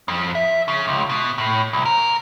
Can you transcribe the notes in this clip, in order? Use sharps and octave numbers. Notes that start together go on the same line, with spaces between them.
F2
E5
C#3
C#2
B2
A2
C2
A#4